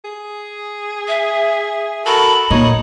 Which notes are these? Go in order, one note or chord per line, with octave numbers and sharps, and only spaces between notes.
G#4
E5
F#4 A4 A#4 B5
A#2 D#4 C#5